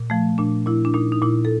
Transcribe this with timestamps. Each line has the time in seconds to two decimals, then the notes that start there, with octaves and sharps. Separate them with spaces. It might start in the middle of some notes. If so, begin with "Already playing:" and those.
Already playing: A#2
0.10 F3 A3
0.38 A#2 D4
0.67 A#2 E4
0.85 D4
0.94 A#2 D#4
1.12 D#4
1.22 A#2 E4
1.45 A4